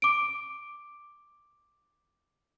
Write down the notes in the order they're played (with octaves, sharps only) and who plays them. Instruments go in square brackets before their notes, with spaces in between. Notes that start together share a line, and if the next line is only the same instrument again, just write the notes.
[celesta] D6 D7